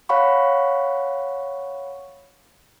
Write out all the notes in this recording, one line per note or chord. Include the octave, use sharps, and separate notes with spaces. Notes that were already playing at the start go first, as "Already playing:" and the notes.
C#5 F5 F#5 B5 C#6